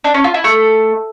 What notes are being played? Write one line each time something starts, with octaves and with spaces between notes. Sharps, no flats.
D4
C#4
F4
E4
A3